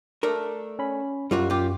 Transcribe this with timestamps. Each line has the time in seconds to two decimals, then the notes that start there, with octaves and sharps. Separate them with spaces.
0.23 A3 D4 A#4
0.79 C#4 B5
1.31 F#2 G3 F4 F#4
1.50 F4 G4